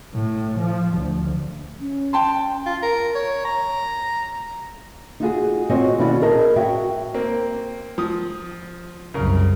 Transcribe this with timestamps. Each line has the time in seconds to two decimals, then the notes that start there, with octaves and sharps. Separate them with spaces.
0.15 A2
0.59 F3
0.97 D2
1.79 C#4
2.13 G5 A5 C6
2.66 F4
2.82 A#4
3.15 C#5
3.45 A#5
5.20 D#4 F4 F#4 G#4
5.70 C4 F#4 C5 C#5 D#5 G#5
5.98 D#2 B2 C#4 E4 F#4 D5
6.21 G#4 A#4 D#5 A5
6.56 F#4 C#5 E5 F5 G5
7.14 A#3 C4
7.98 F3 D#6
9.14 C2 F#2 C#3 A#4